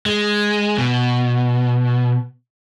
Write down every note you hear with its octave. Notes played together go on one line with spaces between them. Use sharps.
G#3
B2